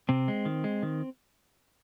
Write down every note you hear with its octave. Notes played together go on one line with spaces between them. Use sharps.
C3 C4
G#3
D#3
G#3
D#3